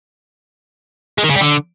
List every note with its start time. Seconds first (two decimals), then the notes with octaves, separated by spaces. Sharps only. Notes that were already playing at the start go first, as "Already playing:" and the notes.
1.18 G#3
1.24 D#3
1.30 C#3
1.35 G3
1.41 D3